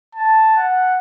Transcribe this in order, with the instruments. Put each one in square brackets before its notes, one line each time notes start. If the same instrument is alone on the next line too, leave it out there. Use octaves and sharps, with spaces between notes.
[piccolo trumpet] A5
F#5